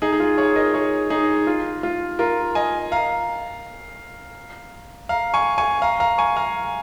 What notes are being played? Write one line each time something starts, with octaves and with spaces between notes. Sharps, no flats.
D#4 G#4
G#4
F4
G#4 C#5
A#4 D#5
G#4 C#5
D#4 G#4
F4
F4
F4 A#4
D#5 G#5
F5 A#5
F5 A#5
G#5 C#6
G#5 C#6
F5 A#5
F5 A#5
G#5 C#6
F5 A#5